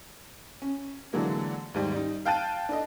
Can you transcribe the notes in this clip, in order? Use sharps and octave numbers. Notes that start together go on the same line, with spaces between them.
C#4
D3 E3 F#3 G#3 A#3
D#2 G#2 G3
G3 D#4
F5 G5 A5 F#6 A6 D#7
D4 A4 D#5